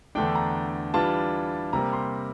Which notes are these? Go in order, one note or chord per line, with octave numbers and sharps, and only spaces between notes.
E2 D3 A3 D4 G5
A#5
E3 G3 D4 F4 A5
C3 G3 A#3 A#5
C6